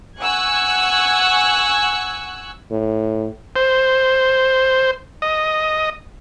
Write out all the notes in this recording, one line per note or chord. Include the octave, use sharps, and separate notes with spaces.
F#5 G#5 C#6 E6 F#6 G#6
A2
C5
D#5